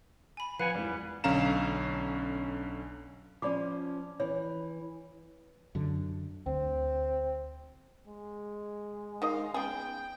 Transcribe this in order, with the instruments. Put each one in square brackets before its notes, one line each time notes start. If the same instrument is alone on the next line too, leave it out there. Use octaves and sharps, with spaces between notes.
[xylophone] G#5 B5
[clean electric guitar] F3 F#5 G#5 [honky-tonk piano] B4 [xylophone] F5
[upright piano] G#1 E2 [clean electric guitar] G3
[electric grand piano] B1 D3 C#4 F5 A#5 E7
[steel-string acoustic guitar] F3 C#4 [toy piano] D5 B5 D6
[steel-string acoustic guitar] E3 [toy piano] C#5
[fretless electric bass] F#2 D3
[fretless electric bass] D2 [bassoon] C4
[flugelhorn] G#3
[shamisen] D#3 D#4 D#5 [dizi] F5
[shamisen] B3 C#4 G#4 [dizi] G5